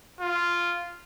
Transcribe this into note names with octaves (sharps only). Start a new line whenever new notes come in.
F4